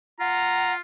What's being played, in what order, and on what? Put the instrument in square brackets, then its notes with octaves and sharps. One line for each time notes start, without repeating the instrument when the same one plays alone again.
[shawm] F4 [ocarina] F#5 [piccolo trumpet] A#5